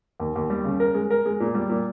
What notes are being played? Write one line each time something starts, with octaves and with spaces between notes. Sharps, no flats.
D#2
D#2
G3
C#3
A#4
G#3
A#4
G#3
A#2
G3
A#2